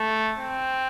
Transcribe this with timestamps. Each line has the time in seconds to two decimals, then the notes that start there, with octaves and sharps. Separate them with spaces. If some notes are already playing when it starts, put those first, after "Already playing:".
Already playing: A3
0.38 C4